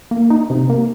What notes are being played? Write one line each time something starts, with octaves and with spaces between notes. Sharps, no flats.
A#3
D#4
C3
A#3